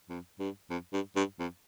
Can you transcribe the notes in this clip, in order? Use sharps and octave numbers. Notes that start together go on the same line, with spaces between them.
F2
G2
F2
G2
G2
F2